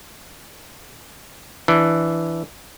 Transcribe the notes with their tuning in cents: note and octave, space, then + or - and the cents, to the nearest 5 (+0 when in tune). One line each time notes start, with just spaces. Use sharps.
E3 +0 D4 +0